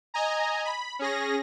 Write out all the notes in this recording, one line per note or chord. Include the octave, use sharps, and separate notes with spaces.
D#5 G#5 A#5
B5
C#4 G#4 A#6